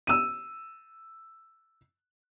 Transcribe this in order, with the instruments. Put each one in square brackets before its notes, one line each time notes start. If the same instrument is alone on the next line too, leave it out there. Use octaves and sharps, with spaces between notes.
[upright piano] E6 D#7